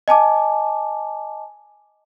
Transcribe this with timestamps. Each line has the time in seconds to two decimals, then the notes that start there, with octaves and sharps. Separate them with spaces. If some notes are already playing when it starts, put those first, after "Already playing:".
0.08 D#5 G#5 A5 D6